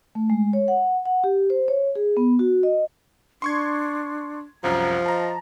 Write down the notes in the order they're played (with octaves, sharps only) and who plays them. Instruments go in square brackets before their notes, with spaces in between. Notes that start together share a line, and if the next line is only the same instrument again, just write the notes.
[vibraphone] A3
G#3
C#5
F#5
F#5
G4
C5
C#5
G#4
B3
F#4
D#5
[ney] D4 [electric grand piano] C6 C#6 G#6
[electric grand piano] C2 F#2 [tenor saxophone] F3 [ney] A#5
[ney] D#5 [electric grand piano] A5 A#5